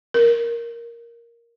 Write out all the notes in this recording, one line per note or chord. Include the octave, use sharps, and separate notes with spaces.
A#4